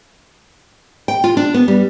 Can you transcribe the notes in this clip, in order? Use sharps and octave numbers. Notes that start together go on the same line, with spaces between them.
G5
F4
D4
B3
G3